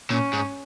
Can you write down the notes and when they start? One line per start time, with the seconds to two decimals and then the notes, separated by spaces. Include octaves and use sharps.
0.10 A#2 C#4
0.33 G#2